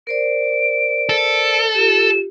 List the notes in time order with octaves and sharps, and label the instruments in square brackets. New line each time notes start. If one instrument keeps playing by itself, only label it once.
[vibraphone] A#4 C5 D5 [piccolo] D7
[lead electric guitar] A4
[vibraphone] F4 G4 [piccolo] E7